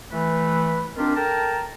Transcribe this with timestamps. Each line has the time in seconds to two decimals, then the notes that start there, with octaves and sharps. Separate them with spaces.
0.12 E3 A3 B4
0.97 D#3 C4 D4 F4 G4 A#4
1.16 A4 A#4 G5 A5 A#5